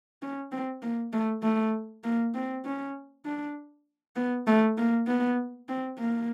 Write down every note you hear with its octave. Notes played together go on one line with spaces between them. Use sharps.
C#4
C4
A#3
A3
A3
A#3
C4
C#4
D4
B3
A3
A#3
B3
C4
A#3